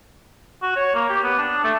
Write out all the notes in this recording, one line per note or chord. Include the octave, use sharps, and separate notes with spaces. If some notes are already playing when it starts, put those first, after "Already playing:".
F#4
C#5
A#3
G4
B3
D4
A3